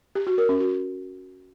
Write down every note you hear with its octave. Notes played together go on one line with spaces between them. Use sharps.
G4
F#4
A#4
C#4
F#4